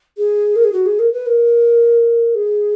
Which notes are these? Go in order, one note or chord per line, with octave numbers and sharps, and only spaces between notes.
G#4
A#4
G#4
F#4
G#4
A#4
B4
A#4
G#4